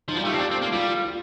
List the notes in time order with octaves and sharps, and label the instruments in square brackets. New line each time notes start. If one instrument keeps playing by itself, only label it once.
[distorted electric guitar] F3 [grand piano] D#4
[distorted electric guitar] G3 [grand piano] F4
[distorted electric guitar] A3 [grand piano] G4
[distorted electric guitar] C4 [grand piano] A4
[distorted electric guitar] D4 [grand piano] G4
[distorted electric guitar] C4
A#3
[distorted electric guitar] G3 [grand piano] F4
[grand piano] F4